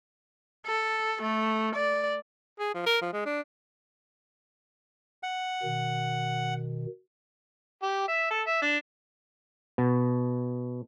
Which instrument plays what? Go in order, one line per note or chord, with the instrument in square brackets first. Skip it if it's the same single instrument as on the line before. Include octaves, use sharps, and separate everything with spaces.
[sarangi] A4
A3
D5
[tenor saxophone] G#4
F3
A#4
F3
G#3
D4
[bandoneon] F#5
[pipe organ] B2 D#3
[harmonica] G4
E5
A4
E5
D4
[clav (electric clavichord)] B2